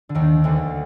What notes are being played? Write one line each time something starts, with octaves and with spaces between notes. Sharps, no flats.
D3
D#2 D#3
D2 D3